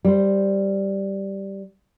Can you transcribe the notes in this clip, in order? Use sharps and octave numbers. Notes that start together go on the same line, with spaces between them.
G3 C5